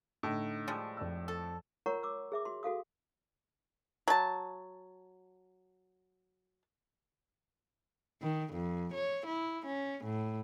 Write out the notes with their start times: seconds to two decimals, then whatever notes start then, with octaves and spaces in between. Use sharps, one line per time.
0.23 A2 D3 D#4
0.68 F3 G3 G#3
0.97 F2 D5 E6
1.28 A4
1.86 F4 A#4 C#5 F#5 A#5 C#6
2.03 D6 E6
2.32 G#4 E5 D6
2.45 F#4 C6
2.63 F#4 A4 F5 D#6
4.08 F#3 A5
8.23 D#3
8.53 F2
8.93 C#5
9.26 E4
9.65 C#4
10.04 A2